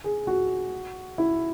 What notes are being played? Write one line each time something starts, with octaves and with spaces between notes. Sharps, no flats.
G#4
F#4
E4